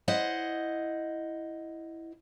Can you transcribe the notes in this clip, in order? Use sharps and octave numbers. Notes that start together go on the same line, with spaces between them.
E4 C5 D#5 F#5